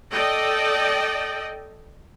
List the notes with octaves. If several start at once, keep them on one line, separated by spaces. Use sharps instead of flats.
A4 D5 D#5 G5